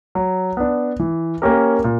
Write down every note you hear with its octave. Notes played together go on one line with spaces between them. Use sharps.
F#3
B3 D4
E3
A#3 C#4 G4 A#4
A#2